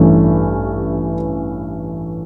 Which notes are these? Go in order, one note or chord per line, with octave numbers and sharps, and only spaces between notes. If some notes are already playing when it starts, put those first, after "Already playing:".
Already playing: A1 G2 E3 A3 C#4